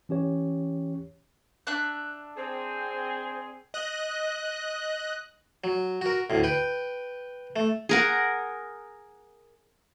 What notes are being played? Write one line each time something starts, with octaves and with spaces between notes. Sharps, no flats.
E3 C#4 G4 C#5
D4 E5 F#6
C4 G#4 C5
D#5 F#6
F#3
F#4 A#4
D2 A2
B4 G5
A3
G#4 A#4 F#5